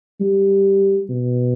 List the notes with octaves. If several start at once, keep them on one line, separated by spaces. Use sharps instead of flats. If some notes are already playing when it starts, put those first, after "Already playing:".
G3
B2